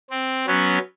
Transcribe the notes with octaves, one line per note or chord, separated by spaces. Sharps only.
C4
F#3 B3 C#4